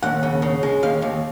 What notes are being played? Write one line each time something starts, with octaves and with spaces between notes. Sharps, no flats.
D#2 F#5
C#3
C#3
G#3
D#2 F5
D#2